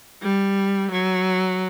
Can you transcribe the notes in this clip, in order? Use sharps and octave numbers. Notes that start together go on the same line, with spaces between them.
G3
F#3